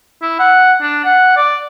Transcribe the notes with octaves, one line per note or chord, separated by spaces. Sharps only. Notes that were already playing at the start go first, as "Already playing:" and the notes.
E4
F#5
D4
F#5
D5